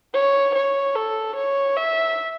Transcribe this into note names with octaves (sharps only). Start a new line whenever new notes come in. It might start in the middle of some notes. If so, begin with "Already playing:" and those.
C#5
C#5
A4
C#5
E5